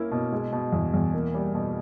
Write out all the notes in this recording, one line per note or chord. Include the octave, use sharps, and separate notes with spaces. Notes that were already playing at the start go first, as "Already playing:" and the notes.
Already playing: A#3 C#4 E4
B2
G#3
B2
E2
E2
A#3
G3
B2